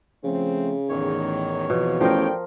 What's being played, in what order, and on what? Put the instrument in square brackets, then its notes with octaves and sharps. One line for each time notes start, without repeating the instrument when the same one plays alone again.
[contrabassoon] C#3 [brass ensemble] F3 A3 C4
[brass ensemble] A1 D#3 [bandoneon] E2 C#5
[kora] B2 [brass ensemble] E3 F3 C4
[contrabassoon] A1 [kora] F3 A#4 [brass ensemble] A4 D5 G5